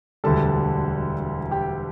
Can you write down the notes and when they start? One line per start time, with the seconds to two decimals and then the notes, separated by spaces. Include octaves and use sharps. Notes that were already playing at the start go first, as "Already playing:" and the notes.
0.24 E1 D2 D3 G3 A4 A5
1.51 G4 G5